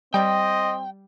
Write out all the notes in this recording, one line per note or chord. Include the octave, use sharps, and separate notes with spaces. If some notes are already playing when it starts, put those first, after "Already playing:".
G3 C4 D#5 G5